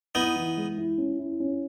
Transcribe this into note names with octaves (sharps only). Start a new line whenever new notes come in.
B3 D#4 E4
E3
G#3
E4
C#4
E4
C#4